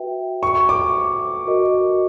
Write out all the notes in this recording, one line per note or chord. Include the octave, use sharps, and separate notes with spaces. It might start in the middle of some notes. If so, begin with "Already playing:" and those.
Already playing: F#4 B4 E5 G5
C#6
D6
F#4 A#4 D#5